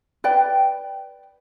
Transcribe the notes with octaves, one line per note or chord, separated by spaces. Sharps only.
B4 D5 G5